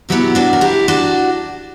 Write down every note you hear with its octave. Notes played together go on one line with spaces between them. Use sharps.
B2 F#3 B3 E4 G4
D4 F#4
A#4
E4 G4
D4 F#4